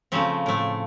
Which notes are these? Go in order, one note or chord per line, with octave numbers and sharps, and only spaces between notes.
C#3 F3 A3 C4
A2 A3